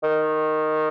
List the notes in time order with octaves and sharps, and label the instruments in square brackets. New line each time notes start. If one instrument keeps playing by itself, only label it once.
[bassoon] D#3